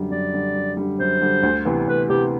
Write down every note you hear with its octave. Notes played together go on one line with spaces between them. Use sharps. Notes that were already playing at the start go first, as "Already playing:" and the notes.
Already playing: F#2 D3 G3
F#2 D5
D3 G3
F#2
D3 G3
F#2 C5
D3 G3
D2
C3 E3 B3
D2 B4
C3 E3 B3 G4